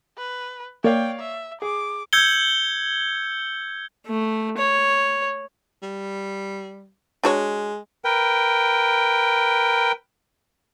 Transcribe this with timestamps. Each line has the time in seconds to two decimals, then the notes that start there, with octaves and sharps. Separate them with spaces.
0.18 B4
0.84 A#3 C#5 D5 F5 G5
1.20 E5
1.62 G#4 D6
2.13 E6 G6 G#6 C#7 G7
4.07 A3
4.58 C#5
5.82 G3
7.24 G#3 D4 F#4 C#5
8.05 A#4 B4 G5